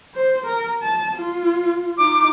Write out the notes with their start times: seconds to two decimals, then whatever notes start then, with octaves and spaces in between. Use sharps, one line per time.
0.15 C5
0.46 A#4
0.82 A5
1.16 F4
1.98 D#4 F4 D6